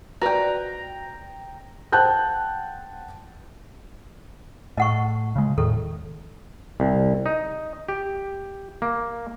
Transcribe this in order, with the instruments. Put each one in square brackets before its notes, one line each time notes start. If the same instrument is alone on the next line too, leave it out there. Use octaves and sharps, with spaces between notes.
[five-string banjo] F#4 B4 [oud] D5 [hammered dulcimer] G5 A#5
[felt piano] C5 F#5 G5 A5 F#6 G6
[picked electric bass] A2 [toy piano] D#5 F#5 C#6
[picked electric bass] C#3 G#3
[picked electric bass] E2 A2 D#3 [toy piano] A4
[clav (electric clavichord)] C2
D#4
G4
A#3